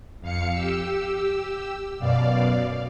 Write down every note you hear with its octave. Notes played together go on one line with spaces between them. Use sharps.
F2 F5 C#7
G4 E6
F#2 B2 D5 F5